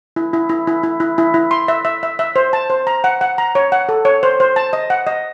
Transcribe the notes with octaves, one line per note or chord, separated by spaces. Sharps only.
E4
E4
E4
E4
E4
E4
E4
E4
C6
E5
E5
E5
E5
C5
A5
C5
A#5
F#5
F#5
A#5
C#5
F#5
A4
C#5
C5
C5
A5
D#5
F#5
D#5